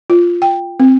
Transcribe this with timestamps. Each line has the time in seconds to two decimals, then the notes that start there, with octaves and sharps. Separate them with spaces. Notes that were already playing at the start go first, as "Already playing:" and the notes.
0.10 F4
0.42 G5
0.80 C4